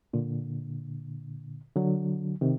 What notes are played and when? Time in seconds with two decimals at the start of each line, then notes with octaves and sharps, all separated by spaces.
0.13 A#2 D3
1.76 D3 F#3
2.41 C3 D#3